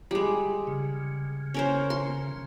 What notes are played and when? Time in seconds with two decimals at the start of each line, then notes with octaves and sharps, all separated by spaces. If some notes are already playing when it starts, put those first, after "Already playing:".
0.11 G3 G#3
0.67 C#3
1.54 C#4 A#4 C5
1.90 C6